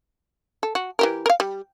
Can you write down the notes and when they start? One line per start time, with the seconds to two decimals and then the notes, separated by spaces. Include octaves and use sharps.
0.63 A4
0.75 F#4
0.99 E3 G4 A#4
1.26 A#4 F5
1.40 G3